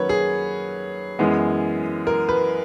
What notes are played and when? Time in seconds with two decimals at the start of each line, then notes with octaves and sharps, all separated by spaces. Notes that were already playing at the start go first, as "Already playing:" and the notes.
Already playing: D#3 F#3 A#3 C#4 B4 C#5
0.09 G#4
1.19 F#2 E3 G#3 B3
2.07 A#4
2.29 B4